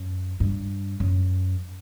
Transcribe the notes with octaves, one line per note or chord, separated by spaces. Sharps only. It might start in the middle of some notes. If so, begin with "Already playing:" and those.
Already playing: F#2
G2
F#2